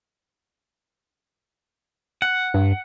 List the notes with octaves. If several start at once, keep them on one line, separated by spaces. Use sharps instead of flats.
F#5
G2